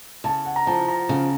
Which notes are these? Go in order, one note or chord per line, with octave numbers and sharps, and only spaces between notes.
C#3 A5
F#5
A#5
F3 A5
A#5
C#3